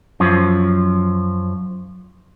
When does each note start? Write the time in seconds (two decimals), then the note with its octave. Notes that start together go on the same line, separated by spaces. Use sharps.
0.20 F#2 F3